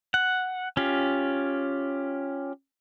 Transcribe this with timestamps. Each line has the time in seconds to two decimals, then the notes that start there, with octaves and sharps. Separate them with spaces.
0.14 F#5
0.77 C#4 F4 G4